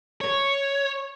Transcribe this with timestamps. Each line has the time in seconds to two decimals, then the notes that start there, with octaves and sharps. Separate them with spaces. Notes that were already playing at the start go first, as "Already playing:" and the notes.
0.21 C#5